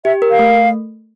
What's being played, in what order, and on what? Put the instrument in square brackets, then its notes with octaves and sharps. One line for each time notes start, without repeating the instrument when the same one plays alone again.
[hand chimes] G4 [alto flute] E5
[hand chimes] A#4
[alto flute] F5
[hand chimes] A3